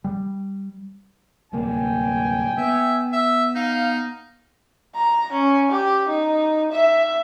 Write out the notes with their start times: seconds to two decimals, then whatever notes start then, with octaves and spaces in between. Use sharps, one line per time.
0.04 G3
1.53 D1 C2 A#3 G5 G#5
2.58 B3 E5
3.12 E5
3.55 D#4 F5
4.95 A#5
5.33 C#4
5.72 G4
6.09 D#4
6.73 E5